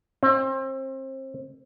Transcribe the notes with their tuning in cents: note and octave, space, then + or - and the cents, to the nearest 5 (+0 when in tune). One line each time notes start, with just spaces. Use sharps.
C4 +30